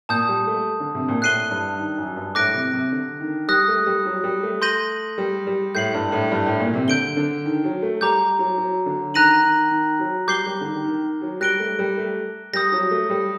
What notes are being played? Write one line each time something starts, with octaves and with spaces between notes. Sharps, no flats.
A#2 A5 D#6 G6
G3
A3
D3
C3
A#2
A2 F#6 C7 D#7 G7
G2
D#3
F#2
G2
A2 D6 F#6 A#6 D7
C3
C3
D3
D#3
G3 D#6 F#6 A#6
A3
G3
F#3
G3
A3
C6 G6 A#6 D#7 F#7
G3
G3
A2 G6 C7 F#7
G2
A2
G2
A2
A#2
C3
D3 G6 D7 G7
D3
D#3
F#3
A3
G3 A#5 D6 G6
F#3
F#3
D3
D#3 A#5 F#6 A#6 D#7 F#7
D#3
D#3
F#3
G3 D6 G6 C7 G7
G3
D3
D#3
D#3
D#3
F#3
G3 F#6 A#6 D7 G7
A3
G3
A3
G3 D#6 G6 A#6
F#3
A3
G3